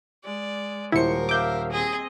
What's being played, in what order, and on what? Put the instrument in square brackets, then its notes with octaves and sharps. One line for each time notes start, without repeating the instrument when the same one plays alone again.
[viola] G#3 [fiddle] D5
[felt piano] D#1 C5 [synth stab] E4 C#7 [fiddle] A#4
[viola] E5 F5 [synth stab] D6 G6
[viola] C4 D#5 [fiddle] G#4